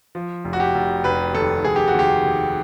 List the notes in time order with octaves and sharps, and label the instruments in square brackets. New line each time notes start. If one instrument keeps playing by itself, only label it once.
[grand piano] F3
F1
F#4
G4
F1
F1 B4
D#2 A4
F1 G#4
G4
F#4
D#2 G4
D#2